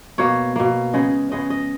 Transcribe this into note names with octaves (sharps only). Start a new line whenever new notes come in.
B2 A#3 C#5
B2 A#3
C#3 G#3 B3 D#5
C#3 G#3 B3 D#5
D#5